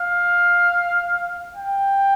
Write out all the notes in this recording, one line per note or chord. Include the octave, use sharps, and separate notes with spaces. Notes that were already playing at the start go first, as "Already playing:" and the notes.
Already playing: F5
G5